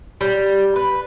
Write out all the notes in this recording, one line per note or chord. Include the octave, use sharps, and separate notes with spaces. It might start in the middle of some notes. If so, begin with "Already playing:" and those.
G3
B4